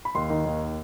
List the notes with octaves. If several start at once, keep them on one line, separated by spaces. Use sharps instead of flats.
B5
D#2 C6
D#3
D#2